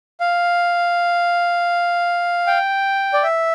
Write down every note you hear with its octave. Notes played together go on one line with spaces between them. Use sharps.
F5
G5
D5
E5